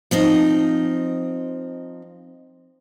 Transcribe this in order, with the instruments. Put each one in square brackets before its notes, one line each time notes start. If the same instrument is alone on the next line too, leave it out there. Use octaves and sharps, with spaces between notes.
[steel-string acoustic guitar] F3 C4 D#4 D#5